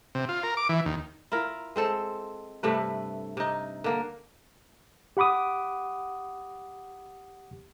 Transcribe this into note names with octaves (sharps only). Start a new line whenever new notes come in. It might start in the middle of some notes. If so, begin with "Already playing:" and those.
C3
F4
A#4
D6
E3
D#2
E4 F4 A#4
G#3 C4 A4 C5
G2 C3 A3 B4
C3 D#4
D3 A#3
G4 F#5 B5 D6 D#6